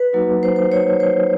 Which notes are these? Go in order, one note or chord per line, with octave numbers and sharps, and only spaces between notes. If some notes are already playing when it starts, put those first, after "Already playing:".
Already playing: B4
F#3 A#3 D#4 F#4
C5
C5
C#5
C5